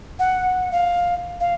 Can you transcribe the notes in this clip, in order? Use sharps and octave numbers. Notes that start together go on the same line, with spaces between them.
F#5
F5
F5